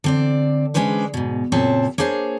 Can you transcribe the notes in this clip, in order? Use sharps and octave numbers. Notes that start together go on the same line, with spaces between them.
D3 C4 D5
G#3 C#4 D4 B4 C5
G#2 B2
F#2 A#2 C#3 C4 C#5 A5
A#3 D4 G#4 C5 C#5